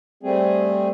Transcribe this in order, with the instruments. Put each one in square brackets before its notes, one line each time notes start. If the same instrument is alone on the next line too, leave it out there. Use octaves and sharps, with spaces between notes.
[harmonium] G3 A3 C4 G#4